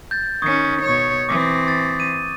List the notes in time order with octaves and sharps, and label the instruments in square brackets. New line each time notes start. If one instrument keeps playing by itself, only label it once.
[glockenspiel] G6 A6
[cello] D#3 C#4 [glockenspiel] C#6 D#6 G#6
[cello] B2 C#5
[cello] E3 C4 [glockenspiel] D6 D#6
[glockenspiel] A6
D#7